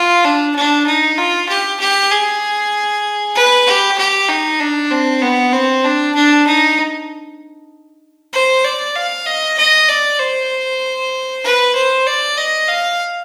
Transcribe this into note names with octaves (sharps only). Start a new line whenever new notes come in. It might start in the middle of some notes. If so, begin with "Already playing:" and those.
Already playing: F4
D4
D4
D#4
F4
G4
G4
G#4
B4
G4
G4
D#4
D4
C4
B3
C4
D4
D4
D#4
C5
D5
F5
D#5
D#5
D5
C5
B4
C5
D5
D#5
F5